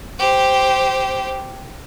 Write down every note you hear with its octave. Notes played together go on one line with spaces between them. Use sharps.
G4 C5